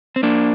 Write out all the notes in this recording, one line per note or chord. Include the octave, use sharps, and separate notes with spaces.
C4
A#3 D4